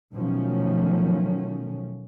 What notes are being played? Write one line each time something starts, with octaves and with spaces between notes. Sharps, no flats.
B2 D#3 F3 F#3 A3 C#4